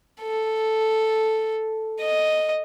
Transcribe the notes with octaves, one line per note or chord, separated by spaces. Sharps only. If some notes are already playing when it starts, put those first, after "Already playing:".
A4
D#5